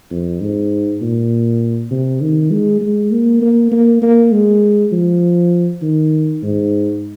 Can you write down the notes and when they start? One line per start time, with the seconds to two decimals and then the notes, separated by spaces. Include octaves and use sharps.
0.10 F2
0.41 G#2
1.01 A#2
1.91 C3
2.21 D#3
2.51 G#3
2.81 G#3
3.11 A#3
3.42 A#3
3.71 A#3
4.02 A#3
4.32 G#3
4.92 F3
5.82 D#3
6.43 G#2